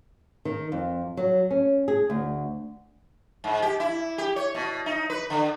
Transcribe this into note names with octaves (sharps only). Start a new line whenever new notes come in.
D#3
F2
F#3
C#4
G#4
D2
G#2
G4
E4
G4
C#5
B2
D#4
B4
D3